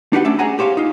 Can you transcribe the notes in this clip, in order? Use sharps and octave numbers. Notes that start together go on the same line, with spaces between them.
D4 D#4 F#4 G4 B4 F#5
A3 C#4 D5 E5
G#4 C#5 F#5 G#5 A#5
G4 C5 C#5 F5
D#4 F4